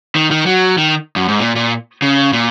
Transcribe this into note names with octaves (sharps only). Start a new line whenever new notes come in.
D#3
D#3
F#3
D#3
F#2
G#2
A#2
A#2
C#3
A#2